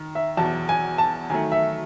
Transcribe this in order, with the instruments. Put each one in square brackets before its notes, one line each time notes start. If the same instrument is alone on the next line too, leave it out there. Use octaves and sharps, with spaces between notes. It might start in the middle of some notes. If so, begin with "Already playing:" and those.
Already playing: [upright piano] D#3
[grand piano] E5
[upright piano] E2 B2 F#3 [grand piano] A5
[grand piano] G#5
A5
[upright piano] D#3 F#3 A3 [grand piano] G#5
[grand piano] E5